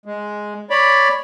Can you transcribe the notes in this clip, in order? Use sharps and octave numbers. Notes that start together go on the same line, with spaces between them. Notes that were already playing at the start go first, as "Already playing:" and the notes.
G#3
C#5 D5 B5